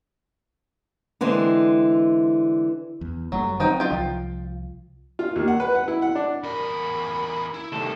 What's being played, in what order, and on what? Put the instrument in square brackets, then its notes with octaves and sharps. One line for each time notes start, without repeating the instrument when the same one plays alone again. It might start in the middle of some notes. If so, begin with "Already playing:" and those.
[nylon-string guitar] D3 E3 G#3 C4
[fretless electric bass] E2
[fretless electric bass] F#1 G3 A3 [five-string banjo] F#3
[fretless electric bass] D#3 F#3 C4 [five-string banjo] F3 D#4 G5
[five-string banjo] F4 G5
[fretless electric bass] C2 F3
[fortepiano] F4
D#2
F#5
B4
F#5
E4
F#5
D4
[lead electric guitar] E2 A#4 [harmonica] B5
[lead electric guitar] E4
[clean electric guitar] C2 A3 A4 [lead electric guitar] C3 D#3